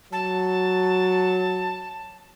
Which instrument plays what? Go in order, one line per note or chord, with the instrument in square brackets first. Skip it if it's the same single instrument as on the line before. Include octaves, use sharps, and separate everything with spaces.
[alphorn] F#3 [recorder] A5